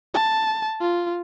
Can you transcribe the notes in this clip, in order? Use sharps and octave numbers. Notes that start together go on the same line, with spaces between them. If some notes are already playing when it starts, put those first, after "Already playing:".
A5
F4